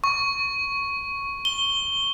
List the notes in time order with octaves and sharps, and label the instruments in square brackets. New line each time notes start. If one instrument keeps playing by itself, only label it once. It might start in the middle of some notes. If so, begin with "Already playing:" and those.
[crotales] C#6
G7